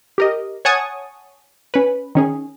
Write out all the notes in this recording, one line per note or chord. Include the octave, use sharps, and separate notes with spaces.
G4 A#4 D#5
C#5 F#5 G#5 A5 C#6 D#6
C#4 B4
D#3 C#4 G#4